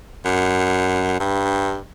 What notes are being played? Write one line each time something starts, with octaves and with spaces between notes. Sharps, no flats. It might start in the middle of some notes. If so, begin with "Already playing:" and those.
F#2
G2